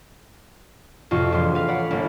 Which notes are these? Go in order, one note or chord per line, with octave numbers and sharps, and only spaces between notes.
F2 A2 C3 F4 F#4 C#6
E1 F3 F4 C6
F3 B4 F5
C#5 D5 F#5 B5
G1 A#3